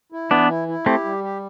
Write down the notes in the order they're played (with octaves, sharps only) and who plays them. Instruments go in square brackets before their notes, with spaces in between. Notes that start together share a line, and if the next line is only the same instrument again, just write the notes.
[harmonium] E4
[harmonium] E3 [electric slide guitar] B3 D4
[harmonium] E4
E4
[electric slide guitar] A3 C4 [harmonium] G4
[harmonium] G3
G4